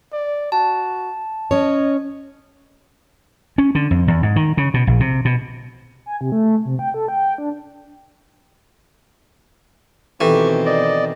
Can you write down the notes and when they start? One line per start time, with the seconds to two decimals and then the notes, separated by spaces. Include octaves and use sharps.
0.13 D5
0.52 F#4 A5
1.51 C#4 C#5 D#5
3.58 C#4
3.75 D3
3.91 F2
4.08 E2
4.23 G#2
4.36 D#3
4.57 C#3
4.74 B2
4.87 A#1
5.00 C3
5.25 B2
6.06 G#5
6.21 C3
6.32 A3
6.65 C3
6.79 G5
6.94 A4
7.08 G5
7.38 D4
10.21 B2 D#3 E3 C4 G4 A4 C#6
10.66 D5 D#5